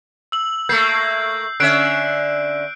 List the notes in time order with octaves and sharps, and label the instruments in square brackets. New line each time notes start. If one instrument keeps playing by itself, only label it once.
[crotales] E6 F#7
[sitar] A3 A#3 [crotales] G6 C7
[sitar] D3 C#4 E5 [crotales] F#6 C7 D7